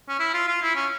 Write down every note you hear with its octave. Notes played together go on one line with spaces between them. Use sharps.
C#4
E4
F4
F4
E4
C#4